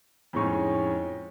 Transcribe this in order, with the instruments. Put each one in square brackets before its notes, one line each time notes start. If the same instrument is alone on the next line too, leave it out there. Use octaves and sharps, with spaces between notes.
[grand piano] F2 A2 G#3 C#4 D#4 C#6